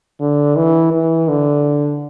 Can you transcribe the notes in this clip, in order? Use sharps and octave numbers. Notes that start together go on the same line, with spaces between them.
D3
E3
E3
D3